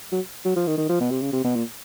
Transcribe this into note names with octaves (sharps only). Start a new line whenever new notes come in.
F#3
F#3
F3
D#3
D#3
F3
B2
C3
C#3
C3
B2
A#2